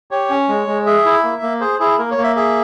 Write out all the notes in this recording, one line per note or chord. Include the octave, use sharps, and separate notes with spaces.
G4 C#5
C#4
G#3
G#3
G#4 E5
E4
A#3
A#3
G#4 C5
E4 G#4
A#3 A#4
C#5
A#3
E5
G#4 E5